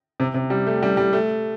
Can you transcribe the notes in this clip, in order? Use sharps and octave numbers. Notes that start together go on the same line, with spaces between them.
C3
C3
G3
A3
G3
G3
A3